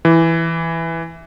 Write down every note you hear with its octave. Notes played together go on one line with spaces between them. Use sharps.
E3